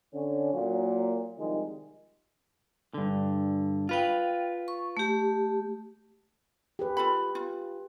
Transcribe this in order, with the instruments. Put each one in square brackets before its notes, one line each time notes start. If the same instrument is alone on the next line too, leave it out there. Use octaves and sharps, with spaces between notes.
[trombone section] D3 C#4
A#2 F#3 A#3
C2 D#3 F3 G#3
[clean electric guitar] G2 D3
[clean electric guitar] F4 B4 [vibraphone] F5 G5
[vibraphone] C#6
A3 G4
[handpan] G4 G#4 B4
[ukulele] F4 A4 B5
F4